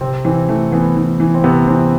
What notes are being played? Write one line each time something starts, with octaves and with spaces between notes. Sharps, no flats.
C3 C4
E3 C4
E3 A3
E3 B3
E3
E3
C4
C3 B3
E3 C4